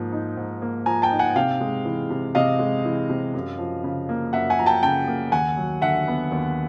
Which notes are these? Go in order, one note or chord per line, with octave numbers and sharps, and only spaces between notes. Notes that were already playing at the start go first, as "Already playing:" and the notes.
Already playing: G#2 F3 A#3
D#4
G#2
A#3
F3 G#5 A#5
G5 A5
D#4
F#5 G#5
C3 F5 G5
G#3
E3
C3
C3 D#5 F5
G#3
E3
C3
F#2
F3
C#3
A#3
F#2 E5 F#5
F#5 G#5
F3 A#5
G5 A5
C#3 G5 A5
A#3
D#2 F#5 G#5
F#3
D3 E5 F#5
B3
D#2